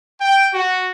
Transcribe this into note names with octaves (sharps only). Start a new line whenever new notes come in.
G5
F#4